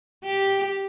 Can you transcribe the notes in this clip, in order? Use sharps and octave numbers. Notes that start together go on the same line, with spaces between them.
G4